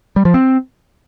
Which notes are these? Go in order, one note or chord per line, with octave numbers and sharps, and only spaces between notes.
G3
F3
C4